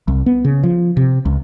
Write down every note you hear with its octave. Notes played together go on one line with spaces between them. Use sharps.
C2
B3
C#3
F3
C3
C#2